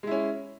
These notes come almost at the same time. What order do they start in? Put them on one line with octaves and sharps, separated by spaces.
G#3 E4 C#4